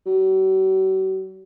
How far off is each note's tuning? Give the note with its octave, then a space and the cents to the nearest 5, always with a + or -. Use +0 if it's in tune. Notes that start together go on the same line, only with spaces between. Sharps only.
F#3 +45